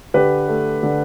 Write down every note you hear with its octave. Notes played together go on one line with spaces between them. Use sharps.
D3 G4 B4
A3
D3